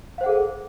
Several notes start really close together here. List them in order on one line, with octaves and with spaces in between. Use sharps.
F5 C5 F#5 G#4 A4